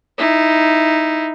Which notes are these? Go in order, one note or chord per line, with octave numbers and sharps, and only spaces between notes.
D#4 E4